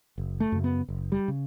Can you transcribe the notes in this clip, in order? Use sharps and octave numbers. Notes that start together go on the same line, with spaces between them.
F#1
A3
F#2 C#3
B3
F#1
G3
C#3